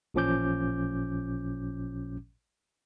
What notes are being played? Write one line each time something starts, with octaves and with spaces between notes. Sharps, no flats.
A1 A#2 F3 C#4 D6 G6